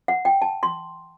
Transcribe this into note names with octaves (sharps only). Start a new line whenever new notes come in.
F#5
G5
A5
C6